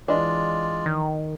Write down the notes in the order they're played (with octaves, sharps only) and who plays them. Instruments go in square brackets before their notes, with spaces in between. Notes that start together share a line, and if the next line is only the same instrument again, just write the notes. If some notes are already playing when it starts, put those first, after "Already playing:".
[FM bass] E3 [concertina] G#3 F4 D5 [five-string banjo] D4 D#5
[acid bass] D#3